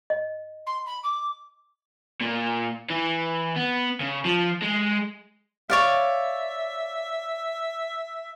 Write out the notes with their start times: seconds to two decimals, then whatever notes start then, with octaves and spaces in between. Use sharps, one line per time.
0.10 D#5
0.66 C6
0.86 B5
1.03 D6
2.21 A#2
2.90 E3
3.56 B3
4.00 C#3
4.25 F3
4.62 G#3
5.70 C#5 D5 E5 F5